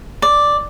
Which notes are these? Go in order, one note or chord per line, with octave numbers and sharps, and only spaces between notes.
D5